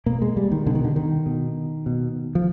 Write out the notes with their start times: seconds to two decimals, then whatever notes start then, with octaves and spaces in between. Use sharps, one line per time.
0.06 B2 A#3
0.22 G#3
0.37 G3
0.51 D#3
0.66 B2 D3
0.75 D#3
0.84 D3
0.96 D#3
1.26 B2
1.86 B2
2.35 F3